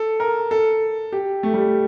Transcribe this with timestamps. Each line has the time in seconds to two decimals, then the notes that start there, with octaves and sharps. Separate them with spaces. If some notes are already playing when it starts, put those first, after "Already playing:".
Already playing: A4
0.20 A#4
0.51 A4
1.12 G4
1.43 A3
1.54 G3